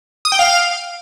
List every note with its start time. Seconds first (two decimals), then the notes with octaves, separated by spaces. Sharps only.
0.25 D#6
0.32 G5
0.39 F5